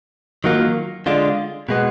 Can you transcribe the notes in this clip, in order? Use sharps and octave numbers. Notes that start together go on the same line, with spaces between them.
D#3 F#3 A#3 F4
D3 G#3 D4 F4
B2 G#3 B3